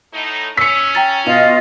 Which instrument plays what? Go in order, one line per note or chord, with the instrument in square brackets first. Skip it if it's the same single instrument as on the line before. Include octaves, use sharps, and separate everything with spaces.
[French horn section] A2 D#4
[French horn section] C#4 [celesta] E6 [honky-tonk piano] B6 C#7
[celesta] G5 A#5 A6
[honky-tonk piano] B2 [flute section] F4 D#5 [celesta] F7